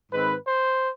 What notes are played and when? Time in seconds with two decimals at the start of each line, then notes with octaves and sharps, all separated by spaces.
0.12 G#2 D#3 G#3 C4 B4
0.45 C5